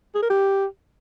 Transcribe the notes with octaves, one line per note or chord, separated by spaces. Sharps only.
G#4
A#4
G4